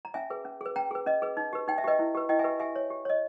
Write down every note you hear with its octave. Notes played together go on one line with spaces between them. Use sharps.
A#5
C#4 E5 G#5
G#4 B4
C#4
G#4 B4
C#4 G5 A#5
G#4 B4
C#4 D#5
G#4 B4
D#4
G4 B4
D#4 G5
E5
G4 B4 D#5 G5
E4
G4 B4
E4 D#5 G5
E5 G#5
G4 B4
G4 E5 G#5
C#5
G4
C#5 D#5